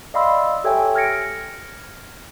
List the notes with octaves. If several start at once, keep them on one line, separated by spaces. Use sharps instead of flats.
D5 D#5 F5 B5 C6 E6
G4 A4 C#5 E5 G5 G#5
F6 G#6 A#6 C#7 D7